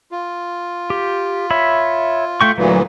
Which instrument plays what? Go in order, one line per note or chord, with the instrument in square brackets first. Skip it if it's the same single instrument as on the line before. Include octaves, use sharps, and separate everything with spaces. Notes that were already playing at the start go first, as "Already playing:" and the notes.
[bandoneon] F4
[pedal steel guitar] G4
C#5 E5 B5
A3 G5 C#6
[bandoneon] D2 A#2 E3 [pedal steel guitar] F#3